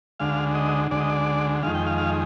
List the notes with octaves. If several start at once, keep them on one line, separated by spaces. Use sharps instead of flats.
D2 D3 G#3 F5
D#5
D2 D3 G#3 D5
D#5
D5
F2 D#3 G#3 F5
G5
F5
F5